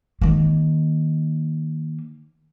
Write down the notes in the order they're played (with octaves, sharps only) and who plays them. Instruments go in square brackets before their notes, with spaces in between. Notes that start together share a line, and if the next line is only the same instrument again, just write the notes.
[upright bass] D#3 A#3